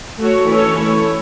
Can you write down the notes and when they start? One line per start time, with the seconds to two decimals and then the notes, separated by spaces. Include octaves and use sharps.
0.20 A3 F#4 A4 C#5
0.49 E3 A3 C#4 A4 C#5
0.78 A3 C#4 E4 C#5